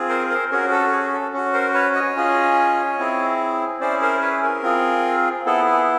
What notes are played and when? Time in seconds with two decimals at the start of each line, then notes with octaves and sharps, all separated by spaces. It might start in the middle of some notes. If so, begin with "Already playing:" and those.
Already playing: C4 F4 G#4
0.09 A#4 C5
0.30 A#4 C5
0.51 C#4 F#4 G#4 A#4
0.71 A4
0.92 G#4
1.13 A4
1.33 C#4 F#4
1.53 A#4 C5
1.74 B4 C#5
1.95 C#5 D#5
2.16 C#4 F4 G#4
2.99 C4 E4 G#4
3.80 C#4 E4 G#4 C5 D5
4.02 A#4 C5
4.21 B4 C#5
4.43 G#4 A#4
4.63 C4 F4 G#4
5.46 B3 E4 G#4 A4
5.66 G#4